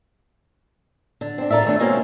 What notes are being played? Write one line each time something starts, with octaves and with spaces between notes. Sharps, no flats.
D3
C4 D4
F4 A4 A#4 D5 E5
D#3 A3 D4
B2 G#3 A#3 C4 C#4